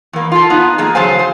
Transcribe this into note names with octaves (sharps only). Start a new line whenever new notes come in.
E2 A#3
F4 A4
B3 D#4
A3 A#3 G#4
C#3 F#3 A4 C5 F5 G#5
C5